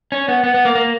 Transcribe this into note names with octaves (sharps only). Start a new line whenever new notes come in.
C#4
B3
B3
B3
A#3
A#3